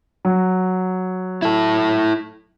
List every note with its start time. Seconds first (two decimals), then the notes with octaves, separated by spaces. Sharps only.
0.25 F#3
1.42 E4 A4